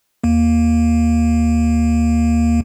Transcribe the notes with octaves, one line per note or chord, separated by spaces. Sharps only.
D#2 A#3